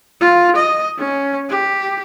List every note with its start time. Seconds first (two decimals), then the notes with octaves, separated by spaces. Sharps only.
0.21 F4
0.56 D#5
0.99 C#4
1.50 G4